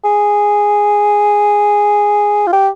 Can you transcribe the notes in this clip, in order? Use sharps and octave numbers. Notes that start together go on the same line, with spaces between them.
G#4
F4
G4